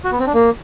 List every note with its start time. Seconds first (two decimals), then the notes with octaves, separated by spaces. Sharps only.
0.04 F#4
0.12 B3
0.19 C4
0.27 D4
0.34 A#3